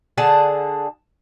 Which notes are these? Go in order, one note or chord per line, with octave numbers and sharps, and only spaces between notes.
D3 G#4 F#5 A5